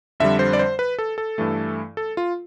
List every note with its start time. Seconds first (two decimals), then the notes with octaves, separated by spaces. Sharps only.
0.20 F2 D3 G3 E5
0.39 C5
0.53 D5
0.59 C5
0.79 B4
0.99 A4
1.18 A4
1.38 G2 E3 A3
1.97 A4
2.17 F4